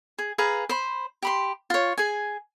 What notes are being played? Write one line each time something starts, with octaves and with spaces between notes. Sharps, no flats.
G#4
G#4 B4 F5 A#5
C5 B5
G4 B5 C6
F4 C#5
G#4 G#5